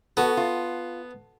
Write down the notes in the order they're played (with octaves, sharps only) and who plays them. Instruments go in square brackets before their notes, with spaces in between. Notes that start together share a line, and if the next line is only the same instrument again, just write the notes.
[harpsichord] B3 [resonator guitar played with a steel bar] F#4 A4
[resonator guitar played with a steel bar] F4